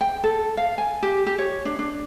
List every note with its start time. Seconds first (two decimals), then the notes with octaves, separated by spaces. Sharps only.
0.01 G5
0.24 A4
0.57 F5
0.78 G#5
1.03 G4
1.26 G4
1.38 C#5
1.65 D4
1.79 D4